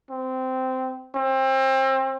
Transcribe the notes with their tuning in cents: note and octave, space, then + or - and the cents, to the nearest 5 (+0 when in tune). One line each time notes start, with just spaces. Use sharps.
C4 -15
C4 +30